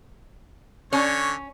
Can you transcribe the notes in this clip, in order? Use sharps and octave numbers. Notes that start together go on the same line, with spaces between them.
D3 C#4 C#5